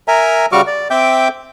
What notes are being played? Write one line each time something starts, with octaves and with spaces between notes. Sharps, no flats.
A#4 E5 G#5 A#5
C#3 G3 F#4 C#6 D6 F6
D5
C4 E5 G5 D6 G6